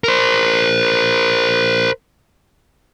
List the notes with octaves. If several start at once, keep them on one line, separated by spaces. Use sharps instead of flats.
A#4 C5